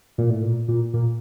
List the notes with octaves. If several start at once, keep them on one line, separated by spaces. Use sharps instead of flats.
A#2
A2
A#2
A#2
A#2